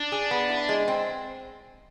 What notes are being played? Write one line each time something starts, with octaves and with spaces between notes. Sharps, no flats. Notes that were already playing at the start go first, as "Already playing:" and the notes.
Already playing: D4
G#4
B3
E4
G#3
C4